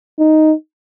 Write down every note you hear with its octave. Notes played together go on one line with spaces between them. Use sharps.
D#4